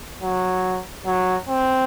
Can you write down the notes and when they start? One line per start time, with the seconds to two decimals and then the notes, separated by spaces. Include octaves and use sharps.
0.21 F#3
1.06 F#3
1.49 C4